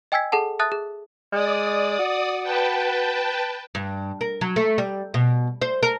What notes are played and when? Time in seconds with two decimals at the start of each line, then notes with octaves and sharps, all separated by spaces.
0.12 D#5 G5 G#5 E6 G#6 B6
0.32 G#4 A4 F#5 A5
0.59 E5 A5 D#6 F#6 A6
0.72 G#4
1.33 G#3 D5 D#6
1.99 F#4
2.43 B4 G5 A5
3.75 G2
4.21 A#4
4.41 F#3
4.56 A3
4.78 G3
5.14 B2
5.62 C5
5.83 A#4